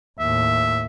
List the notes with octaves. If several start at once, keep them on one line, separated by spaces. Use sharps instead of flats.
D#2 A2 E5